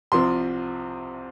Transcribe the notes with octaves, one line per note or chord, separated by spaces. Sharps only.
C2 C3 F3 C4 C6